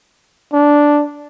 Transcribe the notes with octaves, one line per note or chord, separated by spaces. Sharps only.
D4